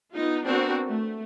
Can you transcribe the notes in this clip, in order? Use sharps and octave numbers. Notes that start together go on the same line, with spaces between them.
B3 D#4 F4
B3 C4 D4 F#4 A#4
A3